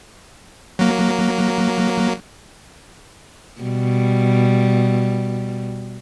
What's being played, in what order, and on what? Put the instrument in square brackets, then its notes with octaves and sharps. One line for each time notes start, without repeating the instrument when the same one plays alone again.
[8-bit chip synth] F#3 A#3
[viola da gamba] B2 G3